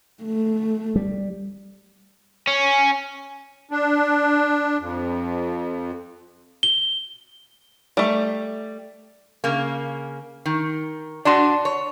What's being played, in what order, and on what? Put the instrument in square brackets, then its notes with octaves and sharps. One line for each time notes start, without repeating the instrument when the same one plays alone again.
[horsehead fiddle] A3
[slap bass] G3
[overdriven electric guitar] C#4
[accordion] D4
F2
[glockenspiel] G7
[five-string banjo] G3 A3
[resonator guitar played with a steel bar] C#3 A#3
D#3
[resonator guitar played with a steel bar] D4 F#4 [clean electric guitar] D5 A5 C6
[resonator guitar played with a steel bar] C#5